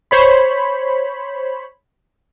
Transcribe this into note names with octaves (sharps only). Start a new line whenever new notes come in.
C5 C#5 B5